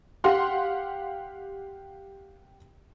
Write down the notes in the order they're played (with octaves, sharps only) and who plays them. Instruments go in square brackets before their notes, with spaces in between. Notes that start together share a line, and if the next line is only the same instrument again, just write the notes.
[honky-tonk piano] G4 F5 F#5 C6